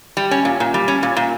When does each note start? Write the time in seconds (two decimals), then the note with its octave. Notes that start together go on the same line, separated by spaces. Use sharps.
0.17 G3
0.31 C#4
0.45 A#2
0.60 A#2
0.74 G3
0.88 C#4
1.03 A#2
1.17 A#2